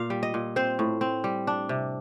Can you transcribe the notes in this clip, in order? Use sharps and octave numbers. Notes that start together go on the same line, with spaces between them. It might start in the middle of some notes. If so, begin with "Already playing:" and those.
Already playing: A#2 F5
G3
D#5
A#2
C4 C5
A2
C4
G3
D4
C3